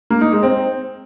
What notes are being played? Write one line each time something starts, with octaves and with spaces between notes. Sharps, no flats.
A#3
D#4
G#3
C4